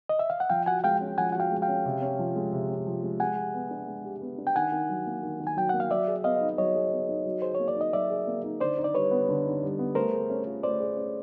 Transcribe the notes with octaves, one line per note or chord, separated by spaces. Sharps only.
D#5
E5
F5
F#5
F3 F5 G5
F#4 F#5 G#5
G#3 F5 G5
C#4
F3 F#5 G#5
F#4 F#5
F5 G5
G#3
F5 G5
C#4
C3
C#4
F3
G#3
C3
C#4
F3
G#3
G#3 F#5 G#5
G4
B3
D4
G#3
G4
B3
D4
G5
D#3 F#5 G#5
D#3
F#3
A#3
D#3
D#3
G#5
F#3 G5
A#3 F#5
F5
F#3 D5 E5
G#4
B3 D#5 F5
D#4
F#3 C#5 D#5
G#4
B3
D#4
F#3
G#4 C5
A#3 C#5
D5
D#4 D#5
F#3 D5 E5
G#4
A#3
D#4
D3 C5 D5
D#4
D5
G3 B4 C#5
B3
D3
D#4
G3
B3
A3 A#4 C5
G#4
C#4
F4
A3 C5 D5
G#4
C#4